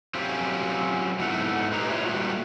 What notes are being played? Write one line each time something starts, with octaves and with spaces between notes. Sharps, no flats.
F#3 C4 C#4 F4 G4
G#2 A3 B3 E4 F#5
G#3 B3 D#4 G4 G#4 A#5
F4 G4 G#4 B4 C#5 E5
G3 A3 A#3 F4 F#4